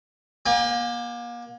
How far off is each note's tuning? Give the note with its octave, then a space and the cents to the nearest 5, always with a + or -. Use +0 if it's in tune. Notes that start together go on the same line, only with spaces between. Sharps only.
A#3 +35 G#5 -40